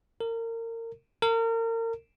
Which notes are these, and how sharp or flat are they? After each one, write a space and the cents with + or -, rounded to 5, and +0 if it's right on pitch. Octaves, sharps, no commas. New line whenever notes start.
A#4 -30
A#4 -35